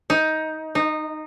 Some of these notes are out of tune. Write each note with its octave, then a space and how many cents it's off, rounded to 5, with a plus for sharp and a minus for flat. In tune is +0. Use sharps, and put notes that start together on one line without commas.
D#4 +15
D#4 -15